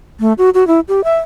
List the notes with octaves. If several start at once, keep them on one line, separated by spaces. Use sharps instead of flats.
A3
F#4
F#4
E4
G4
E5